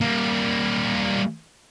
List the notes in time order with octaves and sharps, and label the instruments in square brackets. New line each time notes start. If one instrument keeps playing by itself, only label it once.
[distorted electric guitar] G3 A#3